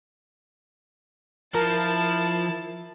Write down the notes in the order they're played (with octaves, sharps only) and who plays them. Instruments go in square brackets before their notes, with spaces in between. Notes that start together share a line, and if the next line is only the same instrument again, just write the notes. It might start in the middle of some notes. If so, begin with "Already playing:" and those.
[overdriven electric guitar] F3 [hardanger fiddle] E4 A5 [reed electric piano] A#4